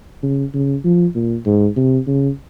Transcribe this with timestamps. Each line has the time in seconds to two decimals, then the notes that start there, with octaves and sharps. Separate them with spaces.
0.23 C#3
0.54 C#3
0.84 F3
1.15 A#2
1.46 G#2
1.77 C3
2.07 C#3